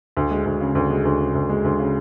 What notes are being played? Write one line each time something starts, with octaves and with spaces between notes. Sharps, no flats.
D2
G#3
D2
C#3
D2
G#3
D2
C#3
D2
G#3
D2
C#3